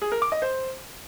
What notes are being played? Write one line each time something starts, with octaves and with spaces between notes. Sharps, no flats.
G#4
A#4
D6
D#5
C5